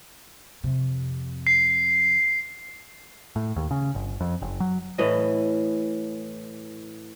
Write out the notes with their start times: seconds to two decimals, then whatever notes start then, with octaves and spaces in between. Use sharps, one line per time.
0.64 F2 C3
1.47 C7
3.36 A2
3.56 D#2
3.71 C#3
3.95 G1
4.21 F2
4.42 F#1
4.60 F#3
4.98 A2 E3 D#5